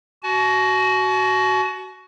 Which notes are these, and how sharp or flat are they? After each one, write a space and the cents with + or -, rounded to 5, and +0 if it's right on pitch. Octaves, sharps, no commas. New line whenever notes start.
F#4 +15 A5 -45